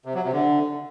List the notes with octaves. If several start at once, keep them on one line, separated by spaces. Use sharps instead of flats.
C3
F#3
C3
D3